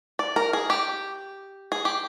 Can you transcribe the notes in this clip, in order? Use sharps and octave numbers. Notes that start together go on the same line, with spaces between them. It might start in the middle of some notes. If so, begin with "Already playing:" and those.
D5
A#4
G#4
G4
G#4
G4